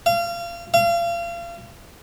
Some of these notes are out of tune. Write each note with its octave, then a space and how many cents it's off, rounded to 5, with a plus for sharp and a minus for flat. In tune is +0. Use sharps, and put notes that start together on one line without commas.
F5 -30
F5 -35